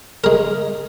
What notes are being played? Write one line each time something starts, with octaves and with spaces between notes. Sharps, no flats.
G#3 A#4